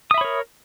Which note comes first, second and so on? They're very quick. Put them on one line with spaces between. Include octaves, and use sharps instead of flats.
D#6 E5 B5 C#5 A#4